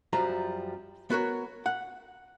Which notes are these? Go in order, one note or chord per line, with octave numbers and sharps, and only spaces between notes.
F#2 F3 G3 A#5
B3 F#4 A#4 C#5
F#5